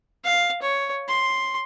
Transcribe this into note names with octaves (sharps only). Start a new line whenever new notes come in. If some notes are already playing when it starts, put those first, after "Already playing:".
F5
C#5
C6